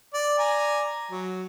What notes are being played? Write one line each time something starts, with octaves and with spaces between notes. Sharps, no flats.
D5
D5 G#5 A#5
F#3